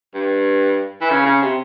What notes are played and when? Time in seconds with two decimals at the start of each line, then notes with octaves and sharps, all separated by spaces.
0.14 G2
1.01 E3
1.10 C#3
1.26 C#3
1.42 C3